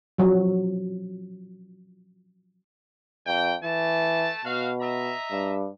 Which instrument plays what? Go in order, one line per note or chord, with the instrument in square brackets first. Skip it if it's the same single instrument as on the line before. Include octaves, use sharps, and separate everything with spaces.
[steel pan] F3 F#3
[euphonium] F2 [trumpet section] G5
[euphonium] E3 [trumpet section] A3 A5
[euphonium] B2 [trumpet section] F#4 F5
[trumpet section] D#5 E5 A#5
[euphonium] G2